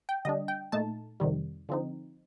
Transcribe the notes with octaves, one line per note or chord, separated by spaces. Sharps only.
G5
D3 G3 D4 D#5
G5
A#2 A3 D#4 A5
F2 C3 D#3 G3
D3 F3 C4 D#4